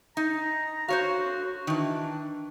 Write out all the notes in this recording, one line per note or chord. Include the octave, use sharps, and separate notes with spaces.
D#4 A#5
F#4 C5 C#5 F5
D#3 E3 D4